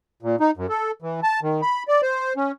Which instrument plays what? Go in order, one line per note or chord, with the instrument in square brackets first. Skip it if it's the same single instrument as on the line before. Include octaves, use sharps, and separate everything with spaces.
[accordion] A#2
D#4
F#2
A4
E3
A5
D#3
B5
D5
C5
C#4